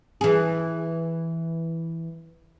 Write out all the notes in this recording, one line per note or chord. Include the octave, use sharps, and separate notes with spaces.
E3 G#4